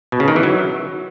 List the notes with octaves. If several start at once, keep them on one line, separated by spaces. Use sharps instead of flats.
B2
C#3
D#3
E3
F#3